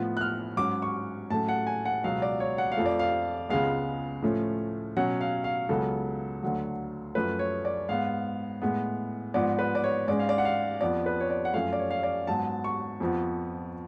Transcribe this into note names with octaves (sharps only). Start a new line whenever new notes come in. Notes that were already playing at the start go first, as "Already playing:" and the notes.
Already playing: A2 F3 B3
F#6
F6
G#2 F#3 C#4 D6
C#6
A2 F#3 A3 C#4 A5
F#5
G#5
F#5
C#2 B2 F#3 B3 F5
D5
C#5
F#5
F5
F2 F3 A3
D5
F5
C#2 C#3 G#3 B3 F5
A2 F3 A3 C#4
B2 F#3 C#4 F#5
F5
F5
C#2 C#3 F#3 B3 A4
D2 D3 F#3
F#2 F3 A3 B4
C#5
D5
G#2 G#3 B3 F5
A2 G#3 B3
G#2 F3 B3 D5
B4
D5
C#5
G#2 G#3 C#4 D5
F5
D5
F#5
F5
F2 F3 B3 D5
B4
C#5
D5
F#5
F#2 F3 A3 C#4 F5
D5
C#5
F5
D5
G#2 F#3 B3 A5
C#6
F2 F3 B3